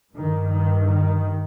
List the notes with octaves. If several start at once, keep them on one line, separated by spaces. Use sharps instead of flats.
G2 D#3
D#3
D#3